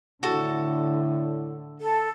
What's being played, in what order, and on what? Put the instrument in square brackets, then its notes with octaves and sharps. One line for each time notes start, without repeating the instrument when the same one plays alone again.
[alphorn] A2 [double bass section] D3 [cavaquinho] F#4 A4
[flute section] A4